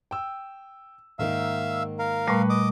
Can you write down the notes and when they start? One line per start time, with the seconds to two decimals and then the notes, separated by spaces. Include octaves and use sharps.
0.11 G5 E6
1.19 G#2 D#3 A#3 E5 F5 E6
1.99 A#4 F5
2.27 A#2 G3 A3 B4 C#6
2.50 D#5 D6 D#6